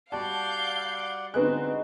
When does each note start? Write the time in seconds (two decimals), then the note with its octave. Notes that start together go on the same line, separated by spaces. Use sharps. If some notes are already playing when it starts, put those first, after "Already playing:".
0.12 G3 F#4 D5 F5 F#5 A5 G6
1.34 D3 G#3 B3 C4 D#4 F#4 F#6